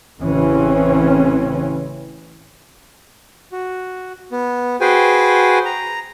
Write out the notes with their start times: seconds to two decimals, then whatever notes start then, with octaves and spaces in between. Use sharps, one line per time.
0.20 A1 C#3 E3 C4 C#4
3.52 F#4
4.31 B3
4.81 F#4 G#4 B4 C5 G5 G#5
5.65 A#5